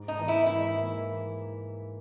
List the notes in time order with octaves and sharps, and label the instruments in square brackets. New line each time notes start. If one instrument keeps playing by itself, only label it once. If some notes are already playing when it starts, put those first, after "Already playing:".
Already playing: [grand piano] G#2
[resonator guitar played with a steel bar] D#4
[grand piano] E3 A#3
[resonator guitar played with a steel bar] E4
[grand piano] G#2 [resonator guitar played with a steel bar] E4
[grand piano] E3 A#3